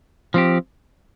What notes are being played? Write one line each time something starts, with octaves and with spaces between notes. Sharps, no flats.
F3 C4 G4